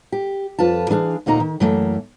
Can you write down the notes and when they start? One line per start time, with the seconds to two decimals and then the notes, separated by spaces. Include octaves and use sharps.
0.12 G4
0.59 F2 F4 B4 A5
0.90 E3 D4 G#4 F5
1.26 D2 A#2 A#3 D#4 A#5
1.40 D#3
1.60 F#2 E3 A3 A#3